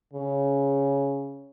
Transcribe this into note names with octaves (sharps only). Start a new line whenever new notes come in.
C#3